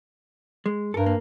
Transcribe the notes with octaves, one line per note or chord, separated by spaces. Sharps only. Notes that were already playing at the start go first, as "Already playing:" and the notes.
G#3
G2 A4 A#4
A#3